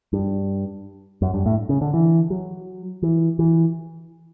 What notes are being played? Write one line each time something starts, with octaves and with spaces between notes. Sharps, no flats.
G2
F#2
G2
A2
C#3
D3
E3
F#3
E3
E3